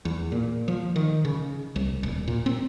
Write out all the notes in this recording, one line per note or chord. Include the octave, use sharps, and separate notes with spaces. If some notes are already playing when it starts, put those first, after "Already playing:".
E2
A#2
F3
D#3
C#3
C2
D#1
A#2
C4